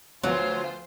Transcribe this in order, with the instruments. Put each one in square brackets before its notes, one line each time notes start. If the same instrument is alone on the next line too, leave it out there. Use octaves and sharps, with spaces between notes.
[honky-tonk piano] D2 F3 B3 [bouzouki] F#3 [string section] F4 C5